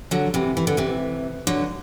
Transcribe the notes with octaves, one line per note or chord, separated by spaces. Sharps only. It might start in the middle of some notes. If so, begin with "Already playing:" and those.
D3 F#3
C3 E3
E3
D3
C3 E3
D3 F#3